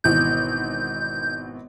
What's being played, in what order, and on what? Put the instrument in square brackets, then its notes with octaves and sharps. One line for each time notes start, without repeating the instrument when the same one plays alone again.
[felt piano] G#1 B2 E3 [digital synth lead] G6